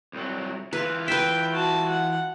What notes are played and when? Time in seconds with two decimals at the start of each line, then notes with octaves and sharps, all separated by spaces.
0.13 C2 F#3
0.73 E3 F4 B4
1.08 B4 E5 G5
1.52 F#4 A5
1.89 F#5